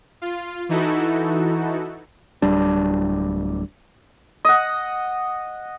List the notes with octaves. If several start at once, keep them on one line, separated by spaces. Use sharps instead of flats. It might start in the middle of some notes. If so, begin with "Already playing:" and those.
F4
E3 D#4 E4 F#4 A4
D1 G3 D4
D#5 F#5